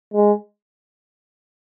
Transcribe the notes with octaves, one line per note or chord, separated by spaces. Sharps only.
G#3